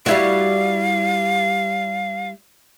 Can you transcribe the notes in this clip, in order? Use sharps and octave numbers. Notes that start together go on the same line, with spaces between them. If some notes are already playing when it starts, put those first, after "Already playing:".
G3 E4 F#4 F5